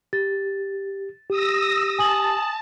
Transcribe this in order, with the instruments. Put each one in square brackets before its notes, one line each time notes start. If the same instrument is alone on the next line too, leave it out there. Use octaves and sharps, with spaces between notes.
[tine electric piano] G4 [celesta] A6
[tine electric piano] G4 [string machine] D#6 E6 A#6
[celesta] G#5 D#6 F#7 [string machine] A5